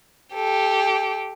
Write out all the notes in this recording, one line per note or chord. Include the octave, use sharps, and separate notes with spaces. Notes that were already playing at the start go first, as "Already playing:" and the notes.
G4 A4